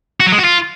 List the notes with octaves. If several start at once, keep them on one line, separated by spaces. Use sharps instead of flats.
F#4
F#3
G#3
F#4
F4